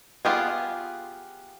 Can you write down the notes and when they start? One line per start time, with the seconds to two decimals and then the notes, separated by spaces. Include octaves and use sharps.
0.25 B3 F4 G4 G#4